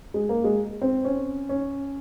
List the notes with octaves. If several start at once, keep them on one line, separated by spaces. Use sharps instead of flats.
G#3
A#3
G#3
C4
C#4
C#4